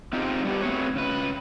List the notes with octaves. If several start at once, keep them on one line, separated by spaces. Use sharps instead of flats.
C4 D#4 F4 G4 G#4 C5
G3 A3 B3 G4
A3 C4 F#4 G#4 B4 C#5
C#3 B4